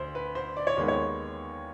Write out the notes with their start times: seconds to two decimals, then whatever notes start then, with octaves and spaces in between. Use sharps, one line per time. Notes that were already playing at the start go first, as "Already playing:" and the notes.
Already playing: D2 C5
0.15 B4
0.35 C5
0.57 D5
0.67 C#5
0.77 D#2 D#3 G#3 B3 C5
0.88 C#5